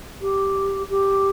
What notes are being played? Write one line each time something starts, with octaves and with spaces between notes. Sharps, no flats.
G4
G4